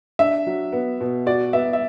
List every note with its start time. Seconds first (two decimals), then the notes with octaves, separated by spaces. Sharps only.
0.19 D4 E5
0.47 F#3
0.73 B3
1.01 B2
1.26 F#4 D5
1.53 B3 E5
1.73 E5